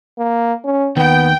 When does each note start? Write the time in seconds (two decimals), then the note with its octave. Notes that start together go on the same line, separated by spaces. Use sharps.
0.18 A#3
0.65 C#4
0.97 D#2 D#3 B3 G5